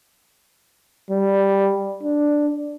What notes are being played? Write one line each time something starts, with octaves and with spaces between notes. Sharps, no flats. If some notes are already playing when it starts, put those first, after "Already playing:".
G3
D4